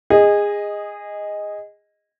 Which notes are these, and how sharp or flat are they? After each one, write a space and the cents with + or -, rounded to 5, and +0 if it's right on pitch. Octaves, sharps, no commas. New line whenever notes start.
G#4 -20 D#5 +0